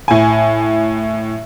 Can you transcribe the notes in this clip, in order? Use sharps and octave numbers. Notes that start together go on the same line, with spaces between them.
A2 G#5